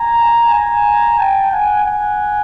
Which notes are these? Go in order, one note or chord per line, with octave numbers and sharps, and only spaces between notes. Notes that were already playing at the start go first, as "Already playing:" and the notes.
Already playing: G#5 A#5
G#5 A#5
G5 A5
F#5 G#5
F#5 G#5